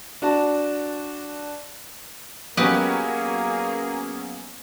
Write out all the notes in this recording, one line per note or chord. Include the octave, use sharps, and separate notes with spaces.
D4 F#4 A5
F#3 A#3 B3 C#4 G4 G#4 B4 D#5